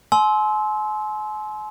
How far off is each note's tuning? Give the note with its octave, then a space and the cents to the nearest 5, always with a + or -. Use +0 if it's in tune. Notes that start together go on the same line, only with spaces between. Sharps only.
G#5 +45 C6 +0 E6 -25